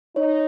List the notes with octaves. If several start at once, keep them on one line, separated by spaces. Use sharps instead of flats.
D#4 C#5